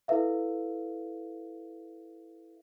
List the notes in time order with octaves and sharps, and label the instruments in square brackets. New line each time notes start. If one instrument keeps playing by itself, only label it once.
[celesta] E4 A4 B4 E5 F5